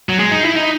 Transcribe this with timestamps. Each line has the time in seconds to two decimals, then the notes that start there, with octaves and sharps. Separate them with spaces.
0.09 F#3
0.19 G#3
0.32 D#4
0.45 E4
0.56 D#4